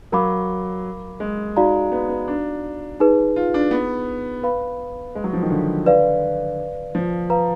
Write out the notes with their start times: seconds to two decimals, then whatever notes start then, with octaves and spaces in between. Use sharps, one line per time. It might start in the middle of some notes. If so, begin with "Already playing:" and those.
0.12 F#3 A#4 F5 B5 D6
1.20 G#3
1.57 D#4 F#4 D5 F5 A#5
1.92 B3
2.10 B3
2.28 D4
3.00 D#4 G#4 B4
3.36 F4
3.54 D4
3.71 B3
4.43 B4 F5 B5
5.15 G#3
5.24 F#3
5.33 F3
5.43 D#3
5.50 D3
5.86 B4 D5 F5
6.95 F3
7.30 B4 F5 A#5